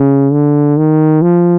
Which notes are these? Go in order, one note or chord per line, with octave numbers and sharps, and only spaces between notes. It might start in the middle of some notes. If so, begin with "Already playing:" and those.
Already playing: C#3
D3
D#3
F3